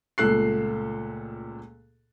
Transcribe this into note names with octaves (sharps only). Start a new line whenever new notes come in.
C#2 A#2 A3 A4 F#6 C7